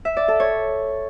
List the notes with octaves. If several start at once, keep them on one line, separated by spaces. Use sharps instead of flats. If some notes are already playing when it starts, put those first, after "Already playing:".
E5
D5
A4
C#5